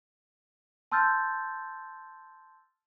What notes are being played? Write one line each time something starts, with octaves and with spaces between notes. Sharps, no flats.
A5 C6 E6 F6 G6 A6